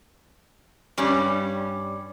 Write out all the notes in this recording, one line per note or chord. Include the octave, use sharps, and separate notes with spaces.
G2 G3 C#4